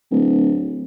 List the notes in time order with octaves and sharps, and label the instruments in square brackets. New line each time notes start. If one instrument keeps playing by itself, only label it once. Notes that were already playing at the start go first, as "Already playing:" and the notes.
[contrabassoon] D1